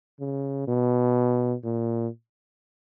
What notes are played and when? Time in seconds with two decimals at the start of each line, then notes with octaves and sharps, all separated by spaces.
0.20 C#3
0.67 B2
1.64 A#2